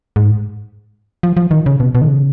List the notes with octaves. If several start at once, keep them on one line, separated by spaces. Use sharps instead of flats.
G#2
F3
F3
D#3
C#3
B2
B2
D#3
C#3